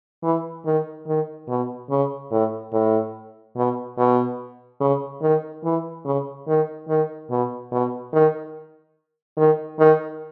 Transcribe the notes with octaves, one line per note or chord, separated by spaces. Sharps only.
E3
D#3
D#3
B2
C#3
A2
A2
B2
B2
C#3
D#3
E3
C#3
D#3
D#3
B2
B2
D#3
D#3
D#3